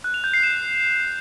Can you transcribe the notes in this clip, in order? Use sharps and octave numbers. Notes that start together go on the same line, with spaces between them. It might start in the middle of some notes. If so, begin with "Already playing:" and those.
F#6
F7
G6
C7
E7